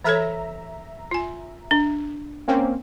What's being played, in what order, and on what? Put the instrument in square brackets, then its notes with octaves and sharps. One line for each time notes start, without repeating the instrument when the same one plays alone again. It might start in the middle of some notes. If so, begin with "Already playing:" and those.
[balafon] E3 A4 C#5 [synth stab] E5 A#5
[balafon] F4 G#5
D4
[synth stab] A#3 C4 C#4